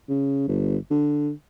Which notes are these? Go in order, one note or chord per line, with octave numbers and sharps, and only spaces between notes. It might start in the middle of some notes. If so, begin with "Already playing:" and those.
C#3
G1
D3